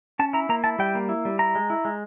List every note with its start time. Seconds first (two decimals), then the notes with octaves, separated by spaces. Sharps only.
0.19 C#4 A5
0.33 E4 A#5
0.49 A#3 A#5
0.64 E4 A5
0.79 G3 G5
0.95 A#3
1.09 E4
1.25 G3
1.39 E4 A#5
1.55 G#3
1.70 E4
1.85 G#3